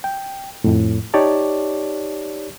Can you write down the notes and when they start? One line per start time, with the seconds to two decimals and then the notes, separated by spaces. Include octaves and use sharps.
0.04 G5
0.64 F2 A2
1.14 D#4 G4 C#5 D5 A5